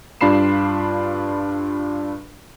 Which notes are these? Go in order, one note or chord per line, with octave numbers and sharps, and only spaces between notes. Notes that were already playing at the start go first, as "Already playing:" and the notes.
G2 D4 F4 B5 C7 E7